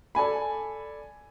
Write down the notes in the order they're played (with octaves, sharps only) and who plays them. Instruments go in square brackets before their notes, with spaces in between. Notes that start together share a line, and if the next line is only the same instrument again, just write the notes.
[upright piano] A4 D5 G#5 B5